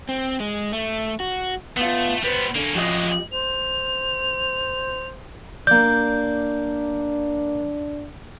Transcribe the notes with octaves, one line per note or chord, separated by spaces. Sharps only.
C4
G#3
A3
F#4
A3 B3 F4
G3 B3 B4 C5
D3 A#3 C#4
F3 G#3 F#4 G4 D#5
C5 F7
A#3 D4 D5 G6